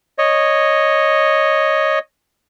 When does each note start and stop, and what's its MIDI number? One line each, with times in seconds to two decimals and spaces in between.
0.18 1.99 73
0.18 1.99 75